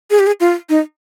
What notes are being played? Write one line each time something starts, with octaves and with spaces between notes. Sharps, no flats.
G#4
G4
G#4
F4
D#4